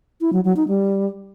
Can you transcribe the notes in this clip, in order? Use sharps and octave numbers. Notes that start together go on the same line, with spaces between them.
E4
F#3
F#3
D#4
G3